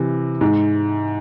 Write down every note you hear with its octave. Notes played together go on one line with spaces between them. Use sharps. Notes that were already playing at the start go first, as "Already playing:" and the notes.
Already playing: C3 E3
G#2